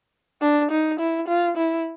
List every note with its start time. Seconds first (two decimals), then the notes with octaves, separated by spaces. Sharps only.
0.42 D4
0.71 D#4
1.00 E4
1.28 F4
1.57 E4